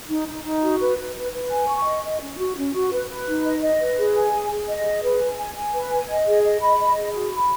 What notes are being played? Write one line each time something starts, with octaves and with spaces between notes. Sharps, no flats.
D#4
D#4
D#4
F#4
B4
B4
B4
B4
G#5
C#6
D#5
D#5
C#4
F#4
C#4
F#4
B4
B4
D#4
D#5
D#5
B4
G#4
G#5
G#4
G#4
D#5
G#4
B4
G#5
G#5
G#5
B4
G#5
D#5
G#4
D#5
B5
D#5
G#4
F#4
B5